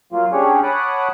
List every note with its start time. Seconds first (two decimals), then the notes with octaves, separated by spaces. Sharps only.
0.12 F#3 A#3 F4
0.33 C#4 D4 G4 G#4 C#5
0.63 C#5 F#5 A5 B5 D6 D#6